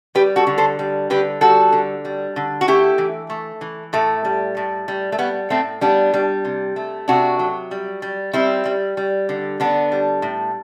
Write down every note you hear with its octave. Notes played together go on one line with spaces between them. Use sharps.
G3 G4 B4
F#4 A4
D3
A4 C5
G3
D3 G4 B4
G3 F#4 A4
D3
G3
D3
F#4
A3 E4 G4
E3
A3
E3
A2 A3
G3
A2
G3
A3
G3 B3
A2 A3 C4
G3 B3 D4
G3
C3
A3
C3 D4 F#4
F#3
G3
G3
G3 C4 E4
G3
G3
D3
D3 B3 D4
G3
A2